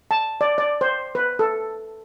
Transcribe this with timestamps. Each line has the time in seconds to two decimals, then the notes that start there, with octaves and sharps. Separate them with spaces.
0.11 A5
0.41 D5
0.58 D5
0.81 C5
1.15 B4
1.39 A4